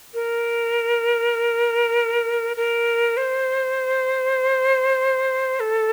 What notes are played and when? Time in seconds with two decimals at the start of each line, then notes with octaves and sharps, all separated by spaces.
0.14 A#4
2.57 A#4
3.17 C5
5.60 A4